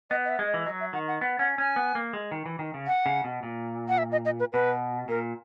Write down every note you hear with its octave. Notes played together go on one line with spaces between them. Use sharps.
B3 D#5
D#5
E5
G#3
D#5
E3
F#3 D#5
E5
D#3 F#5
F#5
B3
C#4 F#5
C#4 G#5
B3
A#3
G#3
D#3
E3
D#3
C#3
F#5
C#3
B2
A#2
F#5
E5
D#5
D#5
B4
B2 B4
A#2 A#4